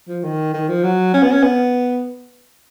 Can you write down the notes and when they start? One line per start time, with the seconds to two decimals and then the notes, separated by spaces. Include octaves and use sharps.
0.09 F3
0.23 D#3
0.54 D#3
0.69 F3
0.83 F#3
1.14 C#4
1.23 B3
1.32 C#4
1.44 B3